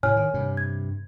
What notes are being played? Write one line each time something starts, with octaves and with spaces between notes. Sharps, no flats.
A2 C3 C#5 G#5 F6
D#3
G2 C3
G#6